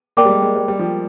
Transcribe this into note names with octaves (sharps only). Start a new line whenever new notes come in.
A#3 A#4 D5 G5 D6
G3
G#3
G#3
G3
G3
F3